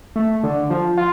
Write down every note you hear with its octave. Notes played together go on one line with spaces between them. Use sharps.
A3
D3
F3
F4